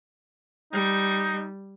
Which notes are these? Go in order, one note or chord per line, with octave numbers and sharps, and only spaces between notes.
G3 D#4